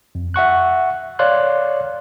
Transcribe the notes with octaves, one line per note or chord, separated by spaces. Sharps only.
F2
E5 F#5 C#6 F#6
C#5 D5 F5 C6 F#6